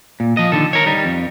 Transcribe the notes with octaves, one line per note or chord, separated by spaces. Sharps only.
A#2
F3 D#5
D3 D#3 A4
A#4 C#5
G3 D#4
F2